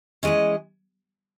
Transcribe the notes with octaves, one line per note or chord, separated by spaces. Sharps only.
E3 G#3 C#4 D#5